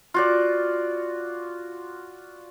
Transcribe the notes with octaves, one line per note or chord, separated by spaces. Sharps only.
F4 F#4 D5